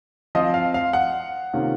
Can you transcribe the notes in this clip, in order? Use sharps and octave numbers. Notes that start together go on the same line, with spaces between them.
F3 C4 F4 D#5
F5
F5
F#5
C3 D#3 A#3 C#4 F4